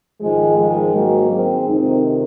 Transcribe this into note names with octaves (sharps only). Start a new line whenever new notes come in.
G#2 D#3 F3 G#3
F3 G#3
F#3 A#3
G#3 C4
F2 C3 D#3 C4 D#4